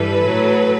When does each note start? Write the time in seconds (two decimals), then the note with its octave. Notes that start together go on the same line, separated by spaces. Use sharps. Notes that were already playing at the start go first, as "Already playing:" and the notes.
Already playing: G2 E3 G3 A4 B4
0.25 A2 F#3